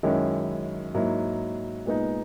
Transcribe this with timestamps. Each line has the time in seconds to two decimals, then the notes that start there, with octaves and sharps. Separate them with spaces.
0.03 F#2 D#3 G#3 C#4 E4
0.94 G#2 F#3 A#3 E4
1.86 A#2 G#3 B3 D#4